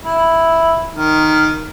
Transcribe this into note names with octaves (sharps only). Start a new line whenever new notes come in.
E4
D#3